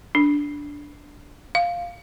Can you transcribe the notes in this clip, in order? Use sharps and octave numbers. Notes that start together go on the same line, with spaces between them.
D4
F5